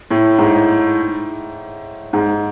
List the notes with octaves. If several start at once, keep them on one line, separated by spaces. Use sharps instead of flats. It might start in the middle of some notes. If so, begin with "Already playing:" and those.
A2
G#2
G#2